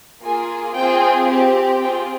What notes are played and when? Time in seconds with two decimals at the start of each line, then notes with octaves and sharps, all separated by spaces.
0.22 A#3 F4 G#4 G#5
0.75 C4 F4 G#4 G5
1.28 C4 G4
1.80 C4 F4 G#4 G5